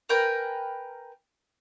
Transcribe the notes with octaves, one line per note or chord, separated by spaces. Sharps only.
A#4 B4 G5 G#5